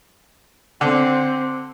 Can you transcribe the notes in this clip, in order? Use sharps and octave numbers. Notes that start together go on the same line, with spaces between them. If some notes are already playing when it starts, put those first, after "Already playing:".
D3 C4